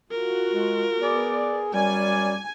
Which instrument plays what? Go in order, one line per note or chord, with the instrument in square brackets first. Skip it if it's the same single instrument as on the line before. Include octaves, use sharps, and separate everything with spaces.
[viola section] F4 F#4 [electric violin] A#4
[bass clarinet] G#3
[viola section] B3 [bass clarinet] G#4 [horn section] D5
[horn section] F#2 D5 [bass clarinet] G3 [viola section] G#5